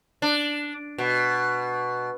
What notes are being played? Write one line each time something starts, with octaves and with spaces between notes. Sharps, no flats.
D4
B2